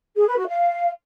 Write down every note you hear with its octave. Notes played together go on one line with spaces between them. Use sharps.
G#4
B4
F#4
F5